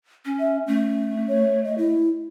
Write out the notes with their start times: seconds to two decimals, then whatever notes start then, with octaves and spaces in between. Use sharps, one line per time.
0.25 C#4
0.39 E5
0.68 A3 C#4
1.28 C#5
1.64 D#5
1.78 E4